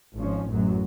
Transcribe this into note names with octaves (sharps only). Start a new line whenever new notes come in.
G#1 F3 C#4
A1 F#2 F#3